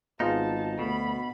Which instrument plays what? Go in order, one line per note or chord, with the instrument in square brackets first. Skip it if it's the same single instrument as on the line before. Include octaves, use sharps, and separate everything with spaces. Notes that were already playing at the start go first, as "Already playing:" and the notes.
[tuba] G#1 [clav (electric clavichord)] B3 F4 G#4 [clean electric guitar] D#4 [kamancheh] A5
[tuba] D2 [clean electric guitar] B2 [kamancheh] B5